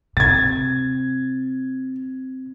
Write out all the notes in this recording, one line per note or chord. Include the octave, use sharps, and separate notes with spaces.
C3 G#6 A6